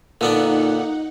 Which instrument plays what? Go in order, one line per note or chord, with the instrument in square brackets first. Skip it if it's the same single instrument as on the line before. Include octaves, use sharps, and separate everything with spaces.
[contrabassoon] A#2 [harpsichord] D3 B3 D4 [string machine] D#4 F#5 [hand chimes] A#4 F5